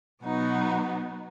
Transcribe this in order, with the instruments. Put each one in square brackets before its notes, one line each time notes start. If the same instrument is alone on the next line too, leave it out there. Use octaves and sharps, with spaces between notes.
[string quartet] B2 F#3 B3 D#4 F#4